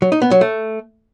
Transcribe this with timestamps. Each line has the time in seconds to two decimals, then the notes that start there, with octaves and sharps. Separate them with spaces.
0.02 F#3
0.12 D#4
0.22 B3
0.31 F#3
0.41 A3